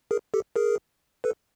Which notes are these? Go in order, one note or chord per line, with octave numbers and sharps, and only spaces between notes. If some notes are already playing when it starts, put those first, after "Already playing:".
G#4 A#4
G4 A4
G#4 A#4
A4 B4